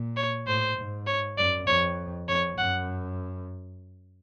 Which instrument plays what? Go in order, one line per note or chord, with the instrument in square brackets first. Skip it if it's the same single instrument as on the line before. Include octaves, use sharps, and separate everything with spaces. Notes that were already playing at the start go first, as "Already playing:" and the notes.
Already playing: [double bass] A#2
[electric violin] C#5
[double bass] A2 [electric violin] C5
[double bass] G#2
[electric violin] C#5
[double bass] F#2 [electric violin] D5
[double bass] F2 [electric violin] C#5
[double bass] F2 [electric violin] C#5
[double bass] F#2 [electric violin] F#5